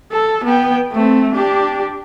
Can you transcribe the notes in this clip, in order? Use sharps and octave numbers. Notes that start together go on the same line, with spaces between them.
A4
B3 G5
A3 C4
D4 G4